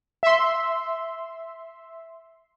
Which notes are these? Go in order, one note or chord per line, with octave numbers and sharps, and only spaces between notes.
E5 C6